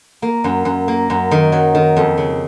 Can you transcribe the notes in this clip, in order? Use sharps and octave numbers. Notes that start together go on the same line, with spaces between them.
A#3
F#2
F#2
A#3
F#2
D#3
F#3
D#3
F2
C#3